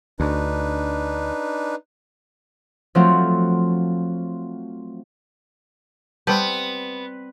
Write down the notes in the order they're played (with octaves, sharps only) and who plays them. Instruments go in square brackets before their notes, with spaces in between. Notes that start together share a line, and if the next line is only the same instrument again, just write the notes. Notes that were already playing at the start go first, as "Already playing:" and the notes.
[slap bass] D2 [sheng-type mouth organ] D4 D#4 B4
[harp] F3 F#3 A3 C4 F4 F#4
[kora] G3 C4 [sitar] B3 [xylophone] B4 A5 G6